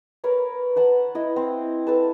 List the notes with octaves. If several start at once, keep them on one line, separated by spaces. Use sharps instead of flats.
A#4 B4 C#5 A#5
B4 F#5 A5 B5
E4 D#5
C4
A4 B4 A5